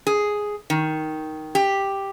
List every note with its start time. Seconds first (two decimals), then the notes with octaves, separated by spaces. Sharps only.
0.07 G#4
0.70 D#3
1.55 G4